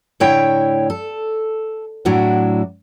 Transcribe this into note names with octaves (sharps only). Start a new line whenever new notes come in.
A2 D3 E4 C#5 G5
A4
A2 F#3 D4 E4 F#4